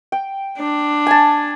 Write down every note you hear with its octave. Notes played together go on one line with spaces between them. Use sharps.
G5
D4
G#5 A5